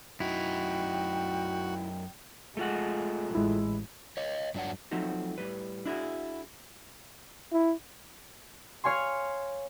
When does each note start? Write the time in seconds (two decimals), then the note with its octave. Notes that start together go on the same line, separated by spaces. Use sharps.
0.20 F#2 D#4 E4 F#4 G5
2.57 G#3 A3 F4 F#5
3.35 A1 G#3 E4
4.17 C#5 D#5
4.55 G2 F#3 D4 C#5 F#5
4.91 F3 F#3 A3 C4 D#4 F#4
5.38 A2 G3 B4
5.85 D4 E4 F#4 G#4
7.52 E4
8.84 C#5 F5 G#5 C6